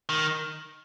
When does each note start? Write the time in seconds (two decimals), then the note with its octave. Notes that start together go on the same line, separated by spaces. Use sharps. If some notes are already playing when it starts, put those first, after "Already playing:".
0.09 D#3